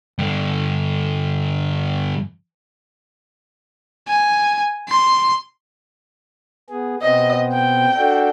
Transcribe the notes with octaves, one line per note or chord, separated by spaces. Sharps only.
G2 D3
G#5
C6
B3 G#4
B2 B3 C4 D#5
G5
D4 F#4 A4